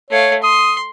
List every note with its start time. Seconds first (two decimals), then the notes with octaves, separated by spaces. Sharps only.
0.10 A3 C#5 F5
0.43 C6 D#6